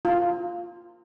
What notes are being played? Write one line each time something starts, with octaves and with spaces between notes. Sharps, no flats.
F4